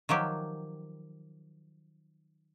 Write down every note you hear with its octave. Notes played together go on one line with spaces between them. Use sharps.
D#3 F3 F#3 G4